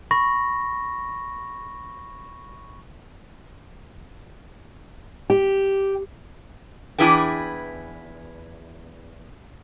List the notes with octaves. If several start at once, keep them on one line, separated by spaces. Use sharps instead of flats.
B5 C#6 A#6
G4
E2 D4 E4 G#4 B4 G5